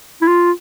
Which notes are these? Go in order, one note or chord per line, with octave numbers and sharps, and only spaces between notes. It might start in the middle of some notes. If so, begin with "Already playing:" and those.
E4
F4